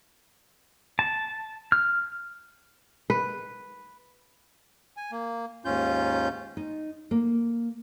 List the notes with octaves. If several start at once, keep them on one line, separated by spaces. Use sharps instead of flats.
A5
F6
B4
G#5
A#3
D#2 G#2 C#4 F4 G6
D#4
A#3